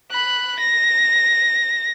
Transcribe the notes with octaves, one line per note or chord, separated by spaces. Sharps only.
B5 F#6
A#6